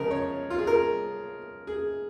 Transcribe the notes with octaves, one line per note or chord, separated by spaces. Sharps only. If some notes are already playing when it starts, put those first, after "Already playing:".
Already playing: C#2 C#3 F3 A#4
C#5
F4
G#4
A#4
G#4